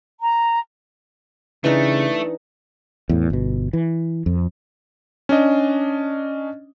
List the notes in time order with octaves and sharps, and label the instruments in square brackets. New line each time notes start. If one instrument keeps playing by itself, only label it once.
[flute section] A#5
[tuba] C#3 [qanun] E3 D4 D#4 [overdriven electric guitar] A3
[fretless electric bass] E2 A2
G1 B2
E3
F2
[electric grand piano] C#4 D4 D#5